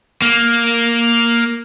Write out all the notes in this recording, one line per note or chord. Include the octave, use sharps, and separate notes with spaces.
A#3